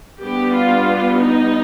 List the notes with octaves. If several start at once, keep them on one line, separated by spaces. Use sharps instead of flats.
G3 B3 D4 G4
F4
D#4